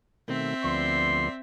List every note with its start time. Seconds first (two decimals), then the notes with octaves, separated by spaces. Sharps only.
0.28 B2 D#3 A3 C4 E5
0.64 D2 F3 B3 D5 C6